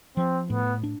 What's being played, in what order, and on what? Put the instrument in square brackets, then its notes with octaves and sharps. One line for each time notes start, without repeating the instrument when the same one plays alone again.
[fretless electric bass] F3 [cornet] C4
[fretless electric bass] A2 [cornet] B3
[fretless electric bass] D4